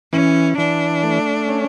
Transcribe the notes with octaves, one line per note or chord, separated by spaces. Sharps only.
E3 C#4
E3 D4
A3
C#4